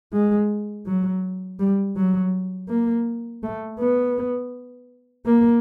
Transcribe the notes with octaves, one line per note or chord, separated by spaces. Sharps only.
G#3
F#3
G3
F#3
A#3
A3
B3
A#3